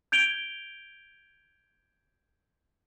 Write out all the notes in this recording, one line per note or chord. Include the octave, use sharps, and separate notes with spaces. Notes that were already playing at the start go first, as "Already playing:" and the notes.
G6 G#6 D7 F7 G7